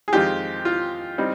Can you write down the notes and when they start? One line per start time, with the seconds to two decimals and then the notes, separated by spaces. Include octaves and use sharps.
0.08 G#4
0.13 F2 D#3 G#3 C4 F4 G4
0.65 F4
1.18 G3 C4 D#4